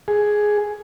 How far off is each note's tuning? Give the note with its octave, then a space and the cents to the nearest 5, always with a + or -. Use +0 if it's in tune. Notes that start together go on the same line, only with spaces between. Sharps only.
G#4 +5